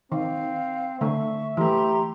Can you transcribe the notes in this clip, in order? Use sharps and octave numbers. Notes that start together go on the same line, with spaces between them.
D#3 C4 F5
D3 A3 E5 C#6
E3 A3 G4 A#5 C6